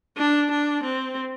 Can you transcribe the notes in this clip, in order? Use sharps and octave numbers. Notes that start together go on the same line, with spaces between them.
D4
D4
C4